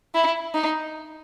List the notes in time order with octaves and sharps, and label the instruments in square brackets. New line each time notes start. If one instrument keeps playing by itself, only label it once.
[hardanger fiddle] E4
D#4